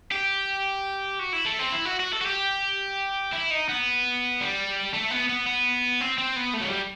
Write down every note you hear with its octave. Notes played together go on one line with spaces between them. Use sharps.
G4
F#4
E4
A3
C4
E4
F#4
F#4
A4
F#4
G4
E4
D#4
B3
G3
A3
B3
B3
B3
C4
C4
B3
A3
F#3
G3